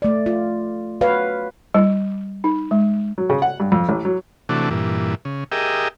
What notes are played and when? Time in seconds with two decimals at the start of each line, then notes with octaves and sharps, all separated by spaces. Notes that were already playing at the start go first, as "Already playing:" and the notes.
0.02 A3 D5
0.26 F4
1.01 F#4 B4 C#5 F5
1.74 G3
2.44 D#4
2.71 G#3
3.18 F#3
3.30 C#3
3.42 F#5
3.60 G2
3.72 F2
3.89 A1
4.05 F#3
4.49 C3 E3 A3 D4 F#4
4.71 G2 A#2 E3
5.25 C#3
5.52 G4 G#4 A#4 D#5 E5 G5